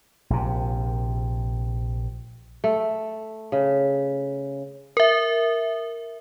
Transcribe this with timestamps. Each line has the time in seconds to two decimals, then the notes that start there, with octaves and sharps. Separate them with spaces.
0.30 A#1 C3
2.64 A3
3.52 C#3
4.97 A#4 E5